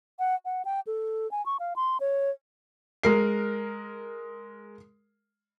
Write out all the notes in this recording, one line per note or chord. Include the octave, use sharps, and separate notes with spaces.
F#5
F#5
G5
A4
G#5
C#6
F5
C6
C#5
G#3 A#4 C7